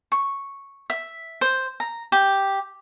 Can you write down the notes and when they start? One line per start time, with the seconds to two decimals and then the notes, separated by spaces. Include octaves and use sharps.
0.12 C#6
0.90 E5
1.41 C5
1.80 A#5
2.12 G4